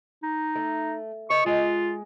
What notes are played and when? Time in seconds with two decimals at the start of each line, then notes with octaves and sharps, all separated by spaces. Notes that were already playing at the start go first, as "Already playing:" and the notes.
0.23 D#4
0.56 A3
1.30 D#5 C#6
1.46 G#3 F4